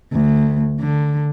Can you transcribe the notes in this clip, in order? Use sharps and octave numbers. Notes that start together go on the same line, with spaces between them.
D2
D3